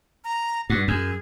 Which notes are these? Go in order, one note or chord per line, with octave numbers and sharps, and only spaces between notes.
A#5
G2 F#4
F#2 G#4